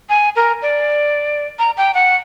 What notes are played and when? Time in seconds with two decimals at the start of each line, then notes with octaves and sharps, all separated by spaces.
0.09 G#5
0.36 A#4
0.62 D5
1.59 A#5
1.77 G5
1.94 F#5